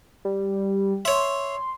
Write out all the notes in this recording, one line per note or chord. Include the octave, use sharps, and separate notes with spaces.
G3
C#5 E5 C6